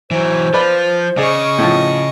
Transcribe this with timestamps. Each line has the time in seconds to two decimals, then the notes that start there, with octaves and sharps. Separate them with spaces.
0.11 E3 F#3 C5
0.54 F3 F4 B4 D5 B5
1.17 C#3 G#4 D5 D#5 C#6
1.58 A2 F3